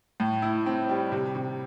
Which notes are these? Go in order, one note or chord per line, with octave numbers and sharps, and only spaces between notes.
A2
E4
C4
G3
C3
C3